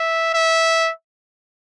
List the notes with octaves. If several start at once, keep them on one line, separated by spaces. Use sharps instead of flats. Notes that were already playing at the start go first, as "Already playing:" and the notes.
Already playing: E5
E5